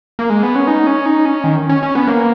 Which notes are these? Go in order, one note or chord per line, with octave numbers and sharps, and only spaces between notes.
A#3
G#3
B3
C#4
D#4
C#4
D#4
C#4
D#3
C#4
C#4
B3
A#3